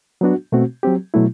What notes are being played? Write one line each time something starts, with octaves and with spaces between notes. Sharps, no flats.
F#3 B3 D4 F#4
B2 A3 C4 F#4
F#3 C4 G4
B2 F#3 A3 E4